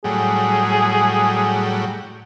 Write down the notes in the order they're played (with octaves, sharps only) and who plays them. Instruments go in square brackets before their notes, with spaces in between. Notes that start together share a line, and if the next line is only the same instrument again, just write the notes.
[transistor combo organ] A2 F#3 G3 [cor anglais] G#4